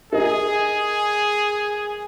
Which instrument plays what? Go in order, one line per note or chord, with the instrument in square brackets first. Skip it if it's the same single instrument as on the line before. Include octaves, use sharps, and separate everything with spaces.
[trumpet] G#4 [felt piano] A#4 D#5